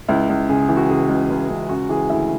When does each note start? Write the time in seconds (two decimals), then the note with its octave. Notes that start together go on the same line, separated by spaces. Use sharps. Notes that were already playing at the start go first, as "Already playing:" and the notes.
0.08 C#2 E4
0.29 C#2
0.49 C#3 G#4
0.69 E3
0.77 F#4
0.89 C#3 G#4
1.09 C#2
1.30 C#2
1.50 C#2
1.69 C#3 F#4
1.89 E3 G#4
2.10 D2 E4